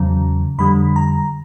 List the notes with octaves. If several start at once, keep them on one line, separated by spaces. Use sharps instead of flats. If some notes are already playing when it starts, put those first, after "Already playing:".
Already playing: E2 C#3 F#3 A#5
F2 D3 G3 B5
A#5